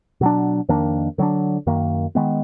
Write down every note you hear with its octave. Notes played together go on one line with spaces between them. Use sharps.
B2 F#3 D4
F2 D#3 A#3 D4
D3 F#3 D4
F#2 D#3 A#3
D#3 G#3 B3